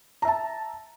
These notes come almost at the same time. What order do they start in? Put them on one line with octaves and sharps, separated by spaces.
A#5 E5 A5